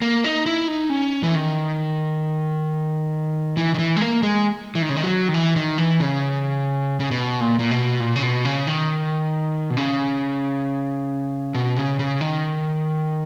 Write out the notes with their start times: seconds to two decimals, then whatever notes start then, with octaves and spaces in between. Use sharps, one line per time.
0.02 A#3
0.24 D#4
0.46 E4
0.68 D#4
0.90 C#4
1.23 E3
1.35 D#3
3.57 E3
3.74 D#3
3.79 E3
3.96 G#3
4.01 A#3
4.23 G#3
4.75 E3
4.82 D#3
4.89 C#3
4.96 D#3
5.04 F#3
5.28 D#3
5.34 E3
5.56 D#3
5.78 E3
6.00 C#3
7.00 C#3
7.11 B2
7.41 A#2
7.59 A#2
7.71 B2
8.00 A#2
8.15 C#3
8.23 B2
8.45 C#3
8.67 D#3
9.70 B2
9.77 C#3
11.55 B2
11.76 C#3
11.99 C#3
12.21 D#3